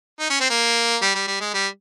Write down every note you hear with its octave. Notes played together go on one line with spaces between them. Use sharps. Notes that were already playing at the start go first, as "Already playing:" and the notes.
D#4
C#4
C4
A#3
G3
G3
G3
G#3
G3